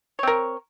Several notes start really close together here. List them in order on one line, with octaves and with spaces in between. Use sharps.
C#5 C4 A#4